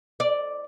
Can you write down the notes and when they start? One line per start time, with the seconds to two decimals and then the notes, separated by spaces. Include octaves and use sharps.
0.20 D5